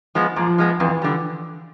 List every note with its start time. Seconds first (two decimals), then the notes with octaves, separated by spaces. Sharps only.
0.15 F3 G#3 B3
0.36 A#2 F3
0.58 F3 G#3 B3
0.79 F2 E3
1.02 D3 G3